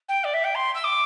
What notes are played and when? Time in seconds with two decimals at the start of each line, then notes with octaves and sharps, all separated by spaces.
0.09 G5
0.24 D5
0.34 E5
0.44 G5
0.55 C6
0.75 E6
0.84 D6